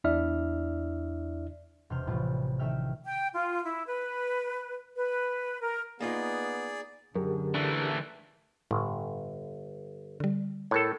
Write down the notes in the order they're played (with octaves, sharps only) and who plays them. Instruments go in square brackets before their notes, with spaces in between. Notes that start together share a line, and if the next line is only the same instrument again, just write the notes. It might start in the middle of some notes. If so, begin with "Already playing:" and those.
[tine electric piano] E2 D4 E4 D5 E5 F6
[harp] E1 C3 C6 F6 G6
A1 A2 F3 G3 F4
D#3 A3 E5 G5 F6
[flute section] G5
F4
E4
B4
B4
A#4
[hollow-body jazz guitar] A#3 D#4 F4 [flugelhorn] B3 [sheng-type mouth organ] G#4 D5
[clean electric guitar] F#2 [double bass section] D3 [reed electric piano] G4 G#4 A#4
[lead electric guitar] E3 A3 [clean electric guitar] D4
[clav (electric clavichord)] G1 [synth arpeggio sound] A2
[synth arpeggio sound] D3 G3
[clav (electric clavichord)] A2 A4 [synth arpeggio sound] A#4 C#5